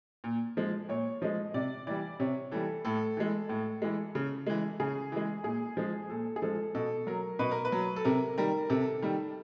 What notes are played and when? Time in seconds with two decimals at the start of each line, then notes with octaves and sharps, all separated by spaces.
0.24 A#2
0.57 F3 G#3
0.89 A#2 C#5
1.22 F3 G#3 D#5
1.54 C3 D5
1.87 E3 G3 D5
2.20 C3 C#5
2.51 E3 G3 A4
2.85 A2 A4
3.17 E3 G#3
3.49 A2
3.82 E3 G#3
4.15 C#3
4.47 E3 G#3
4.80 C#3 G#4
5.12 E3 G#3
5.44 A#2 G#4
5.77 F3 G#3
6.10 A#2 A4
6.36 G#4
6.42 F3 G#3 A4
6.75 B2 A4
7.07 F#3 A#4
7.39 B2 B4
7.52 A#4
7.65 B4
7.72 F#3
7.96 A4
8.05 C3 A#4
8.37 D#3 G3 A#4
8.69 C3 A4
9.02 D#3 G3